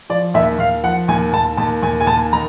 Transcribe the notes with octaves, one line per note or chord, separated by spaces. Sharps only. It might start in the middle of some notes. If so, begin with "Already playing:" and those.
F3 D5
D#2 E5
D#2 F5
F3 F#5
D#2 G#5
D#2 A5
D#2 A5
D#2 G#5
G#5
D#2 A5
D#3 A#5